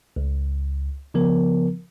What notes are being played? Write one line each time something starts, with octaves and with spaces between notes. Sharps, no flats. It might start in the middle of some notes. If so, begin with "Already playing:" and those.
C#2
C#3 F3 B3 A#4